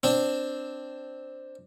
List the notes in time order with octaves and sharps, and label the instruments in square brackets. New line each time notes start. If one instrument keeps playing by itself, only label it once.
[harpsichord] C4 D4